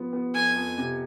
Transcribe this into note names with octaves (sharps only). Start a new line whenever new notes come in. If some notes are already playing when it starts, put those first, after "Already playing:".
Already playing: F3 B3
B3
F2 G#5
F2
C3